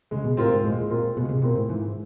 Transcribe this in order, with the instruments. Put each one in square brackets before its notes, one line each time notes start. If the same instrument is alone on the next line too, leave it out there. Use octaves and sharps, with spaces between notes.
[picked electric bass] C#3 [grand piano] G#3
[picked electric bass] B2
[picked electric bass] A2 [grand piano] C4 F4 A#4
[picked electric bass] G#2
[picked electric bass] A2 [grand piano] G#3
[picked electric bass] A#2
A2
[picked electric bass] A#2 [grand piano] C4 F4 A#4
[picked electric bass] B2 [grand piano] G#3
[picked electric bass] C#3
C3
[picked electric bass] B2 [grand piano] C4 F4 A#4
[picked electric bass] A2
[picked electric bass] G#2 [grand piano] E3